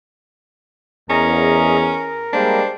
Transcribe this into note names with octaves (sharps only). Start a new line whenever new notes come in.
E2 C#4 G#4 A#4 D#5 A#5
A#4
G3 G#3 A#3 D4 C5